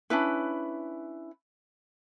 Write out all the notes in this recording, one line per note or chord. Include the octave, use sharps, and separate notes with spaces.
C#4 D4 E4 B4